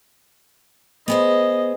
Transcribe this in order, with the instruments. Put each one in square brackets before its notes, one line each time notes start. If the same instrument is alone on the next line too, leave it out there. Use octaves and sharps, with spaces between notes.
[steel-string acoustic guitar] B3 G#4 C5 [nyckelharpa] D#5